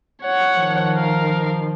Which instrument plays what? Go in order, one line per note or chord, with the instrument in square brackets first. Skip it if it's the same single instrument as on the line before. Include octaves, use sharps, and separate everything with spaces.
[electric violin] C#5 F#5
[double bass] D#3 F3
[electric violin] A#4 F5